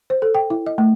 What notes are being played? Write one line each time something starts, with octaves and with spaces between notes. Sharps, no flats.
C5
A4
G5
E4
D#5
A3